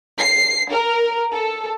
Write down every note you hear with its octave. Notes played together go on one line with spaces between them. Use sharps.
C7
A#4
A4